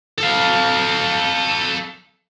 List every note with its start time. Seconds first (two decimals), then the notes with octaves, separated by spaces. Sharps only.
0.18 A4 F5